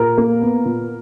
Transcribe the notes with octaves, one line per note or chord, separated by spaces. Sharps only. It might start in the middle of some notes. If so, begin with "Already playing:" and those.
Already playing: A#2 A#4
A#3
B3
A#2